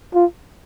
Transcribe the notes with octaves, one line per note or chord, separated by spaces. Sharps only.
F4